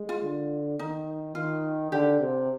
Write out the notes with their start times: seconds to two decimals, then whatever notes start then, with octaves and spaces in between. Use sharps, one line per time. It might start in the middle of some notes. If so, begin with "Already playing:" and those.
Already playing: G#3
0.09 F4
0.22 D3
0.79 D#3 D#4
1.35 D#3 F4
1.91 D3 G4
2.20 C3